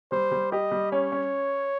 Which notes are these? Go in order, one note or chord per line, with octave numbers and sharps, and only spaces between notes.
G3 C5
G3
G4 D#5
G3
C#4 C#5
C#4